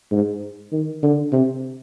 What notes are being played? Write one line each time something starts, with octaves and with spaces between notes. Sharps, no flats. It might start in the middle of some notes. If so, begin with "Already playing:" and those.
G#2
D#3
D3
C3